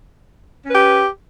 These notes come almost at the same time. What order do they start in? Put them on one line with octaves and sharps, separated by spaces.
C#4 B4 G4